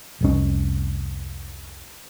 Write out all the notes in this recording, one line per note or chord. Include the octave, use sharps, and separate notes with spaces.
F1 C2 C#4